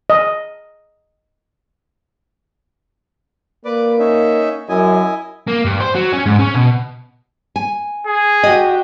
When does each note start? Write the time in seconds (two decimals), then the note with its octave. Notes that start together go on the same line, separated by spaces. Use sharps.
0.10 D#5
3.65 A#3 B4 D5 D6
3.99 C#4 D#4 E5
4.69 F#2 E4 D#5 G#5
5.48 A#3
5.65 G2
5.80 C5
5.95 F#3
6.13 C#4
6.26 G#2
6.39 C#4
6.55 B2
7.56 G#5
8.06 G#4
8.43 F#4 G4 D#5